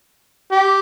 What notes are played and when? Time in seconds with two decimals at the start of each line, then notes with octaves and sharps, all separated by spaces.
0.51 G4